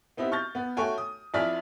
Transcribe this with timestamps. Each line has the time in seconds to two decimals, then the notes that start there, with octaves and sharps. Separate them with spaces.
0.17 B3 C4 D#4 E4 G4
0.32 C#6 F6 G6 A6
0.55 B3
0.77 A3 F#4 A4 C#5 G5 G#5
0.98 D#6
1.34 F2 E4 D5 G#5 F6 B6